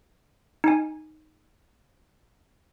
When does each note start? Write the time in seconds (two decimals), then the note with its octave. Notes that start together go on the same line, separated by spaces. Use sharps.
0.64 D#4 G#5